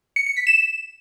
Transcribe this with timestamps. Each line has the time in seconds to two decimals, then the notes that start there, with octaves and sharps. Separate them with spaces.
0.16 C#7
0.26 C#7
0.37 B6
0.47 E7